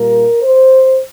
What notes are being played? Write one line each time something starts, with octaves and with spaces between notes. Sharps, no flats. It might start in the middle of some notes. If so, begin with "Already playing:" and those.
Already playing: A#2 G3 A#3 A#4
C5